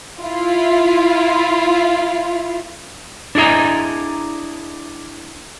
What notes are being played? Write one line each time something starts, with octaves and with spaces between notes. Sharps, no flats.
E4 F4
D4 E4 G#4 D#5 A#5